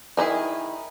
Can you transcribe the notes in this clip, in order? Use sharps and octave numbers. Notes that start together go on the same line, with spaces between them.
D#3 D#4 E4 G#4